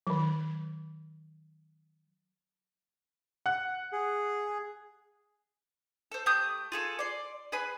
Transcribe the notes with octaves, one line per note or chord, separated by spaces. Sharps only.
D#3 F#3
F#5 F#6
G#4
A4 C5
A3 G4 D#6 G6
F4 G#4 A4
D5 C6
G#4 B4 G#5 B5